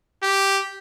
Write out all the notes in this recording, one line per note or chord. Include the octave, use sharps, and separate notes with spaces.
G4